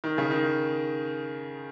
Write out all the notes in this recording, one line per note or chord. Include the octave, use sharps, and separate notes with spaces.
D#3
C#3
D#3